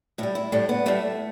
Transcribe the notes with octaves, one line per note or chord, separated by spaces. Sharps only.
A2 G3 E4
E4
A2 G3 D4
B3
A2 G3 A3